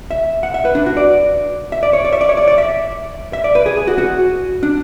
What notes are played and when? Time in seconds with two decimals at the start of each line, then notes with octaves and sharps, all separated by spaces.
0.11 E5
0.43 F#5
0.54 E5
0.65 B4
0.75 D4
0.86 F#4
0.97 D5
1.72 E5
1.83 D5
1.93 C#5
2.05 D5
2.13 E5
2.21 D5
2.29 C#5
2.37 D5
2.48 D5
2.58 E5
3.33 E5
3.44 D5
3.55 B4
3.66 G#4
3.77 G#4
3.87 F#4
3.98 F#4
4.63 D4